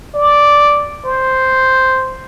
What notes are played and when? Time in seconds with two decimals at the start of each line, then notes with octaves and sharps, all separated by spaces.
0.15 D5
1.05 C5